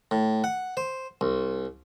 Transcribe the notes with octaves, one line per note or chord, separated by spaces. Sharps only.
A2
F#5
C5
C2